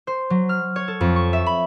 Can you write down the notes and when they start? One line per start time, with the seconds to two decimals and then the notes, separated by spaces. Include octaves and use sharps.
0.07 C5
0.30 F#3
0.49 F6
0.76 C#5
0.88 A4
1.01 F2
1.16 C#6
1.33 E5
1.46 B5